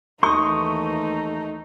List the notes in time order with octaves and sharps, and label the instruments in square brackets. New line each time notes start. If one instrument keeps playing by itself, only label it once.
[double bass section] D#2 E3 [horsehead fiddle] A3 D#4 [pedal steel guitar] C6 D#6 [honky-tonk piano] C#6